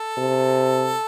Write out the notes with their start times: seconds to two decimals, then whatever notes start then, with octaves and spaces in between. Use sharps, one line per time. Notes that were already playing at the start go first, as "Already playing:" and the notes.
Already playing: A4
0.18 C3